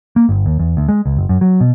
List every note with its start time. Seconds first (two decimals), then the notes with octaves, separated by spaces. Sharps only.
0.16 A#3
0.29 G1
0.46 D#2
0.59 E2
0.77 D2
0.89 G#3
1.06 C#2
1.17 F#1
1.29 F#2
1.41 F#3
1.61 B2